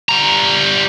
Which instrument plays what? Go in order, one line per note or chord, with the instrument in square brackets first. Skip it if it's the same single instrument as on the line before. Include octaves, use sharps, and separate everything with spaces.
[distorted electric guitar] G3 A#5